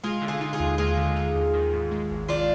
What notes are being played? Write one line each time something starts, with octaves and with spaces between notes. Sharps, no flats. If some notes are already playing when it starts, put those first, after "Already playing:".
G#3 F4 G#4
D3
F4 G#4
D#4
F4 G#4
D#2
G#3 F4 G#4
D3
D#4
D#2
D#3
G#2
G#3
G#1
D#3 D4 F4